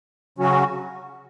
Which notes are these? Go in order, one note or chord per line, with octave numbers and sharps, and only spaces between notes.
C#3 F#3 C#4 F#4